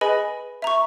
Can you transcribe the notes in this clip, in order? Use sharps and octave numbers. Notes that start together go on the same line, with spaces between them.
G#4 B4 D#5 G#5 B5
E5 A#5 C#6